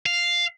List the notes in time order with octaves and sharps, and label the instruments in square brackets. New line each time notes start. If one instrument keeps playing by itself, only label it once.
[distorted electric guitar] F5